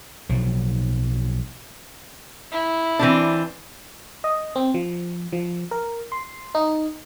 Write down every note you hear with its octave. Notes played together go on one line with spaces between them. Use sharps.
B1 F3 F#3
E4
E3 C4 D4
D#5
C4
F3
F3
A#4
C6
D#4